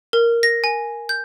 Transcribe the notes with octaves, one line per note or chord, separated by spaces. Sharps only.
A#4
A#6
G#5
G6